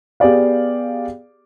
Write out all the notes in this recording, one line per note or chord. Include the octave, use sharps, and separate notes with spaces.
B3 G4 G#4 D5 F5